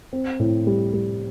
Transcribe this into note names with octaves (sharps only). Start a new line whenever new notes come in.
C4
A2
G3
G3